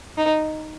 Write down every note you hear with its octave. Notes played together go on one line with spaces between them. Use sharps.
D#4